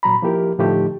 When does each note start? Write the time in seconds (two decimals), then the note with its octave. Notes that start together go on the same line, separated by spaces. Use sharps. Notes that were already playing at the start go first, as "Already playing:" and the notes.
0.03 A#2 F#3 A#5 B5
0.22 F3 A#3 E4 G4 A#4
0.59 A2 D3 F3 A3 D#4 G4